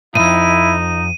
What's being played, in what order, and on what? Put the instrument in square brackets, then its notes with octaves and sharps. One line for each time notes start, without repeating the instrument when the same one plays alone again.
[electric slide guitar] F2 G#2 [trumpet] D#4 [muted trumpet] E4 [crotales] D#7